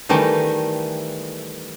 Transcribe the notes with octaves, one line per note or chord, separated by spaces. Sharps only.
D#3 E3 G3 A3